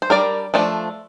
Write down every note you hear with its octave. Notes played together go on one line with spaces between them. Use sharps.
C5
G3 D4 A#4 D5
F3 A3 D4